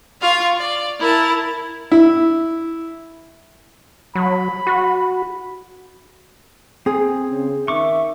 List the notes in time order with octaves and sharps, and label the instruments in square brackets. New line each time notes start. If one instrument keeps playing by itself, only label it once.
[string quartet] F4 F5 C#6
D5
E4 A#4 A5
[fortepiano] E4
[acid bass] F#3 [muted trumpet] B5
[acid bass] F#4
[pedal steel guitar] C4 [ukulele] G#4
[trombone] C#3
[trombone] D#3 [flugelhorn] E5 [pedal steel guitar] C#6 D6